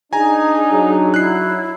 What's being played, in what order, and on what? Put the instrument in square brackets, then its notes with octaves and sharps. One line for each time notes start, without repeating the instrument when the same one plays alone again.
[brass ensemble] D4 D#4 [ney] G#4 [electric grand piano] G#5 A#5
[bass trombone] F#3
[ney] E4 [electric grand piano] F#6 C7